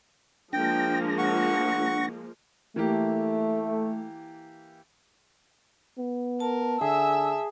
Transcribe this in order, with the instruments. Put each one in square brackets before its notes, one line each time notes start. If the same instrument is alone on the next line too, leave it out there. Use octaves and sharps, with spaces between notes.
[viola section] F3 G#3 A#3 [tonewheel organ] D4 A#6 [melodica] G5
[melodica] F#5 C#6
[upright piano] E3 A#3 G4 [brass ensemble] A3
[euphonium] B3
[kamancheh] A#4 [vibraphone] A5
[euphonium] D3 [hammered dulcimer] G#4 [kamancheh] E5 E6